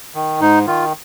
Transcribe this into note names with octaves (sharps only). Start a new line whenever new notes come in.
D#3
G#2 D#4
D#3 F4